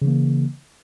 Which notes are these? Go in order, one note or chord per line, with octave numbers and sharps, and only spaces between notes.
C#3 E3 A#3